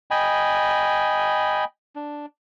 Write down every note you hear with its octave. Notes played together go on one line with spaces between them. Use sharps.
D#5 G5 G#5 B5
D4